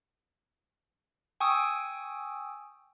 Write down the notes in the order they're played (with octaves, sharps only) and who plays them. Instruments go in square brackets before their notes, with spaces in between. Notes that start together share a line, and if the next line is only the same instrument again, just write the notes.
[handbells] G5 G#5 C#6 D#6 E6